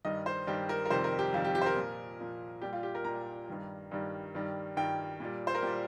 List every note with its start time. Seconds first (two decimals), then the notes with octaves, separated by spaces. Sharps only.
0.05 G2 D#3 G3 D#5
0.26 C5
0.47 G2 D#3 G3 G4
0.69 A#4
0.85 A#4
0.90 F2 C3 D#3 G3 C5
1.04 A#4
1.19 G4
1.33 F2 C3 D#3 G3 F4
1.45 G4
1.55 G4
1.61 C5
1.66 A#4
1.76 A#2 F3
2.20 A#2 F3
2.62 A#2 G3 G4
2.73 F4
2.83 G4
2.95 A#4
3.04 A#2 G3 A#5
3.48 G2 D#3 G3
3.91 G2 D#3 G3
4.35 G2 D#3 G3
4.77 G2 D#3 G3 G5
5.20 A#2 G3
5.47 C5
5.55 A#4
5.62 A#2 G3 G4